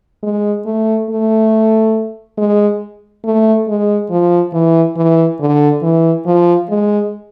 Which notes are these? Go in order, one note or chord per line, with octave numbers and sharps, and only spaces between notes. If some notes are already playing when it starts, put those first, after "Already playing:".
G#3
A3
A3
G#3
A3
G#3
F3
E3
E3
D3
E3
F3
G#3